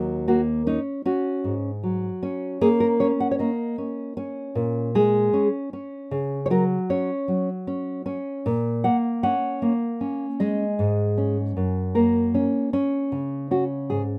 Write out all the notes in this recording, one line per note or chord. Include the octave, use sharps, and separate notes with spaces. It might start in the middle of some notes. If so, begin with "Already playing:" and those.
Already playing: D#2 F#3
A#3 F#4
C#4 D#4
C#4 F#4
G#2
F#3
C#4
A#3 G#4
A#4
C#4 C#5
F#5
C#5
A#3 D#5
C#4
C#4
A#2
G#3 G#4
C#4
C#4
C#3
C#5
F#3 A#4
C#4 C#5
F#3
C#4
C#4
A#2
A#3 F#5
C#4 F#5
A#3
C#4
G#3 D#5
G#2
C#4
F#2
A#3 A#4
C#4
C#4
C#3
C#4 F#4
G#2 G#4